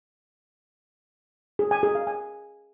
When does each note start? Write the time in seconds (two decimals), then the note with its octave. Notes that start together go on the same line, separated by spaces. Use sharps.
1.59 G#4
1.71 G#5
1.83 G#4
1.95 F5
2.07 G#5